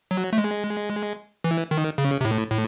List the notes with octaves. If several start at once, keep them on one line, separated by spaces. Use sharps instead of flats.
F#3
A3
G#3
E3
D#3
C#3
C3
A2
A2